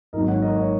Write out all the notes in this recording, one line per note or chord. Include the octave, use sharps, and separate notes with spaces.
G#1 G#2 F#3 A#3 A#4 D#5
C#5 F#5
A#4 D#5
C#5